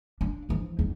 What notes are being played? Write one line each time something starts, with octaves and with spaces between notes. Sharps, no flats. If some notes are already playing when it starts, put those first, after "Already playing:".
D4
E3 F3
E2